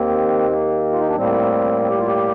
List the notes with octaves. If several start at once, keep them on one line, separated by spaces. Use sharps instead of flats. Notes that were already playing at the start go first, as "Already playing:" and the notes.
Already playing: D#2 D#3 A#3 C4
A#3
F4
D#4
D4
A2 G3 A#3 C4
C4
G4
F4
G4